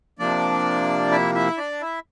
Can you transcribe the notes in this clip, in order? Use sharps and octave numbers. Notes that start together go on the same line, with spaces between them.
C3 F3 A#3 D4 D5
E4 E5
E4 E5
D4 D5
E4 E5